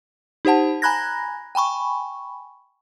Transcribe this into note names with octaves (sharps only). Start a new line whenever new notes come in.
D#4 G4 C5 F#5 A5
G#5 A#5 B5 F#6 G#6 A#6
G5 G#5 B5 C#6